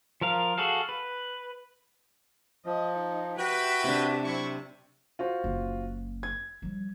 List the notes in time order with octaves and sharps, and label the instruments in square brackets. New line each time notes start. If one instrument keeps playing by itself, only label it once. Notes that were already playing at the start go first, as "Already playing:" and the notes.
[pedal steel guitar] F3 A#4 F5
F#4 G#4 A4 F5
B4
[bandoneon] F3 [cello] D#5
[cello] D#4
[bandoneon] F#4 [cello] G4 E5 [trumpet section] B4 G5
[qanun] C3 D4
[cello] F#3 C4 [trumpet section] E4 C#6
[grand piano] F4 F#4 C5
[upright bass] F#1 C#3
[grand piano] G#6
[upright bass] F3 G3